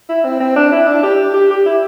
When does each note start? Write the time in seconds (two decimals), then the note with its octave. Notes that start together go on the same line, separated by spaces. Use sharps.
0.09 E4
0.24 C4
0.40 C4
0.56 D4
0.72 E4
0.87 D4
1.03 G4
1.34 G4
1.51 G4
1.66 E4